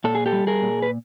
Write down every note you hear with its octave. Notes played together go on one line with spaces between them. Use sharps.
A#2 A4
G#4
G4 A4
G3
G#4 A#4
A#2
B4